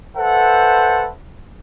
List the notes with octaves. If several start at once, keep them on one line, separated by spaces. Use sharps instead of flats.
A4 B4 C5 E5 F#5